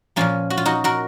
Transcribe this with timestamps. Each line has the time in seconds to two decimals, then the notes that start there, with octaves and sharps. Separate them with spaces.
0.16 A#2 F3 A#3 C#4 F4
0.50 F#4
0.58 F4
0.65 D#4 F#4
0.84 F#4 A#4